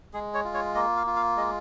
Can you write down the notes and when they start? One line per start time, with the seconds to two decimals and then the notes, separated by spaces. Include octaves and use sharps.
0.13 G#3 G#4
0.34 C#5
0.45 F4
0.54 C#5
0.75 A#3 D#5
0.97 F5
1.07 F4
1.16 F5
1.37 G#3 D#5